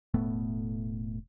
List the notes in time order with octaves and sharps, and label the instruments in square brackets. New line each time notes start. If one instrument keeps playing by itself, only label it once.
[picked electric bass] E1 A2 A3 B3